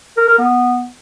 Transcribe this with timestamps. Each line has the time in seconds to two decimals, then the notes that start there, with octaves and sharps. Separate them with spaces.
0.18 A#4
0.28 A#4
0.39 B3